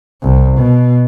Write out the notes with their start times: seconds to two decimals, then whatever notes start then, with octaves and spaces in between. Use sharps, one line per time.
0.23 C2
0.58 B2